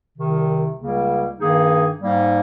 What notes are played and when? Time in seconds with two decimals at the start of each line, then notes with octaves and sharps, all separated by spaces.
0.18 C2 C3 D#3
0.79 C#2 C#3 G3 A#3
1.39 G2 D#3 A#3 D#4 G#4
2.01 G#2 G3 A#3 D#4